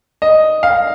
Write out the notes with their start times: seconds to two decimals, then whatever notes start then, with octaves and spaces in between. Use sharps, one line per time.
0.22 D#5
0.63 F5